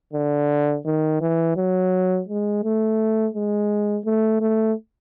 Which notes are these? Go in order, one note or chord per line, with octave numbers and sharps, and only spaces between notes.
D3
D#3
E3
F#3
G#3
A3
G#3
A3
A3